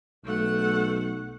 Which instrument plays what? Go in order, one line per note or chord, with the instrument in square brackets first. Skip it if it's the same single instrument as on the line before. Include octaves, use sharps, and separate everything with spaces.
[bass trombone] B1 [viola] A3 F#5